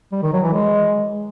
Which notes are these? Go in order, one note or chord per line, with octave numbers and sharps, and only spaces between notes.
G3
D#3
F#3
E3
G#3